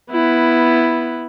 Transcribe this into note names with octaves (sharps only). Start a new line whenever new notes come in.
B3 E4